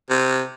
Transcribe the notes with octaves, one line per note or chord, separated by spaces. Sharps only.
C3